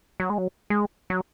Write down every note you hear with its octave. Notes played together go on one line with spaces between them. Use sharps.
F#3
G#3
F#3
G#3
F#3